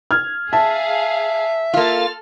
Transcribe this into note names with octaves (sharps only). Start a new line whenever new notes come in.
F6 G#6
G#4 E5 F5 A5
A#3 F4 A4 F6 A6